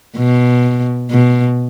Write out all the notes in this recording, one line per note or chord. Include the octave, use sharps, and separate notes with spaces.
B2
B2